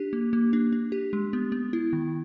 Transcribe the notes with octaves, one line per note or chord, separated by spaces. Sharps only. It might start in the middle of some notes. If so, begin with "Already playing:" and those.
Already playing: D4 G4
A#3
A#3
D4
D4
G4
G#3
B3
B3
E4
D#3